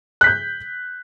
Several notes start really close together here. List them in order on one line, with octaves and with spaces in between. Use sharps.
F#6 B6 G6